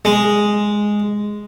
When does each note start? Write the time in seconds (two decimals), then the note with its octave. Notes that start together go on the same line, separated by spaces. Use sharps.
0.05 G#3